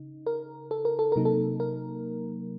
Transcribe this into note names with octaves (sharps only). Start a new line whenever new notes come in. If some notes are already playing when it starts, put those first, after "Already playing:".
Already playing: C#3 D#4
A#4
A4
A#4
A4
C3 F#3 A#3 D#4 A#4
A4
A#4